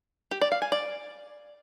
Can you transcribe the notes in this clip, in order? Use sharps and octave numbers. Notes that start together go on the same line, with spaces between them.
G4
D5
F5
G#5
D5